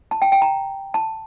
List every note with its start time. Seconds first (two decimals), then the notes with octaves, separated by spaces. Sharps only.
0.11 A5
0.22 G5
0.32 G5
0.42 A#5
0.94 A5